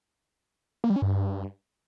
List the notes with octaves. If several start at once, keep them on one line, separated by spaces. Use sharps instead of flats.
A#3
G3
C#4
G2